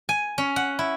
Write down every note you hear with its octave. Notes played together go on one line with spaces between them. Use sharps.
G#5
C#4
F#5
E4